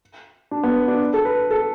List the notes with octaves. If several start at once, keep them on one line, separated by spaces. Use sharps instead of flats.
D4
B3
D4
A4
B4
A4